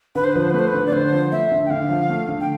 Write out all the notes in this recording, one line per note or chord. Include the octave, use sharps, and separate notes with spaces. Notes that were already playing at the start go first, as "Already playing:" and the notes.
D3 B4
C5
F3 B4
C5
B4
A3 C5
B4
D3
D5
D3 C5
F3
A3 E5
D3
G5
D3 F5
F3
A3
D3
G5